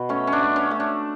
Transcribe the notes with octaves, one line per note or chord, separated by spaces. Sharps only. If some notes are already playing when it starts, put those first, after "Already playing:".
Already playing: B2
A3 C#4
C#4
D4
A3
C#4
A3
D4